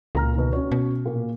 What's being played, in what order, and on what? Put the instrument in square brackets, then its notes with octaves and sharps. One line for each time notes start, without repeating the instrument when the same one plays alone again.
[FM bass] C#2 [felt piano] A#2 A#5 F6
[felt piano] B2 D#3
C#4 F#4 C#5
[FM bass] B2
[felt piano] A#2 A#3